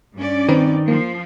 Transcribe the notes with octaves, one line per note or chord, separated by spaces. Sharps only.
G2 C#4 D5
D#3 C4 B4
F3 A#3